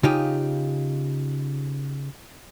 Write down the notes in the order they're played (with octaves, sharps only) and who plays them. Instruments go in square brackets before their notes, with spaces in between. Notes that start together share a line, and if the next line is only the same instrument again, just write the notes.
[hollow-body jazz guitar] C#3 D#4 F4 G4